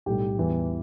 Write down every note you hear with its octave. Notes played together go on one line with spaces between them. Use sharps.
B1 A2 G3 G4
E2 E3 G3